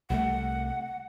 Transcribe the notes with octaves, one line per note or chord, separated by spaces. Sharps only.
C2 G3 A3 F#5